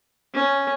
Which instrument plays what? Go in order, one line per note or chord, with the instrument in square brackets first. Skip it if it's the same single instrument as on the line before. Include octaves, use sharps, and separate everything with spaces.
[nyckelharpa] C#4